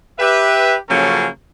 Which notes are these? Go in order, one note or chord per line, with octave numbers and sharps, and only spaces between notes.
G4 B4 E5
C#3 F3 F#3 A#3 C#4 A4